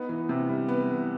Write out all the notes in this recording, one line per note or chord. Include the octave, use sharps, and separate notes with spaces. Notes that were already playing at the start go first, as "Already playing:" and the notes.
Already playing: B3 D#4 B4
E3
C3
G3
B3
E3